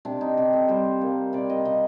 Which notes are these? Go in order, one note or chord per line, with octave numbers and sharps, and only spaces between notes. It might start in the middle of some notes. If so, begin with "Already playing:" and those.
C3 D4
D#4
C3 G4
A4
G3 C5
A#3
C3 D5
D#5
C3 D#5